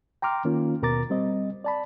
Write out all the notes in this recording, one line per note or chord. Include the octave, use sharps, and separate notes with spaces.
G5 A#5 C6 D6 F6
D#3 A#3 C#4 F4
D#2 B2 A#4 A#5 D6 A6
G3 C4 D#5
D5 A5 B5